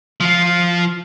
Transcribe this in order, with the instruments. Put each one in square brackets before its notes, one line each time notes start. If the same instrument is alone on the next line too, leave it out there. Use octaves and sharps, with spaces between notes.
[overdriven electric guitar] F3 F4